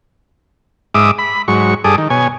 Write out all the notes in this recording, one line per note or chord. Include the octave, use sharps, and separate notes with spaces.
G#2 E5 D6 D#6
B5
G#2 F#3 C#6
G2 G#4 A4 D6 D#6
D#3
B2 C#5 G#5